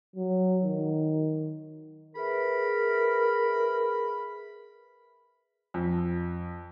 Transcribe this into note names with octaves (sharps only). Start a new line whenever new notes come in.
F#3
D#3
G#4 A#4 B4 E5 B5
F2